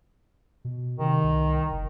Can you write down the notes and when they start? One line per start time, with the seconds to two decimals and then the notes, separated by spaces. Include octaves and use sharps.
0.65 B2
0.99 C3 D#3
1.24 C2
1.72 F#1